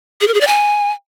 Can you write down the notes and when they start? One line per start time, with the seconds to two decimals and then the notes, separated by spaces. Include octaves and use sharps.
0.21 G#4
0.28 A#4
0.34 G#4
0.41 D5
0.47 G#5